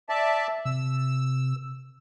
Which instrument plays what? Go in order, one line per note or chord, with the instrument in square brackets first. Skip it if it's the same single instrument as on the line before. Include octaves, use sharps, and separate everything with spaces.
[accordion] D5 E5 A5
[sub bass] C3 [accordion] E6